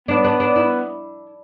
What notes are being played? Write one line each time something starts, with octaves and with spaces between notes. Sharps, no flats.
B3 D4
D4
D4
E4